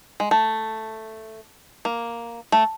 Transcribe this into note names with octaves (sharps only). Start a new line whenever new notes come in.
G#3
A3
A#3
A3